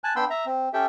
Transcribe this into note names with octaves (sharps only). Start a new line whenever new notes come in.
G#5 A5 F#6
B3 D4 G5 B5 C6 E6
E5 A#5
C4
C#4 G4 A4 E5 G5